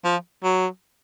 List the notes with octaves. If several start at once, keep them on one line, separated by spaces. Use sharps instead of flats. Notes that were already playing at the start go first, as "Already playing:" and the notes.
F3
F#3